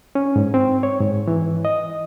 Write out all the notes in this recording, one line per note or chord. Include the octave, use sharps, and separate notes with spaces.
C#4
G#2
C4
C#5
G#2
E3
D#5